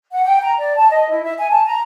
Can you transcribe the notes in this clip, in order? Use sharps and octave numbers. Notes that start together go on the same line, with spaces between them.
F#5
G5
A#5
D5
A5
D#5
E4
E5
G#5
A5
A#5